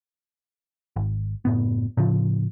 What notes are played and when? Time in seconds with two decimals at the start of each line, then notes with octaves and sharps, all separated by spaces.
0.96 G#1
1.45 F#1 A2 B3
1.97 A2 C#3 F3